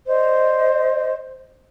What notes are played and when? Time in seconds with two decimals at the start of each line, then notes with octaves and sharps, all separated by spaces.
0.08 C5 D5 D#5